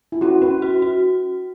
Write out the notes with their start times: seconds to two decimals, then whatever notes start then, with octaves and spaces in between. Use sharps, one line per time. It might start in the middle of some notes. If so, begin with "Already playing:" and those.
0.12 E4
0.21 C#4 F#4
0.42 C#4 B4
0.62 F#4
0.82 F#4